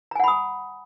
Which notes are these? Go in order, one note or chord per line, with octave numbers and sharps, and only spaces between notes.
F#5 G#5 A#5 B5 D#6